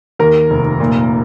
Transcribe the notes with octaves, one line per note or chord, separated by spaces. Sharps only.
D#2 A#4
F1
A#2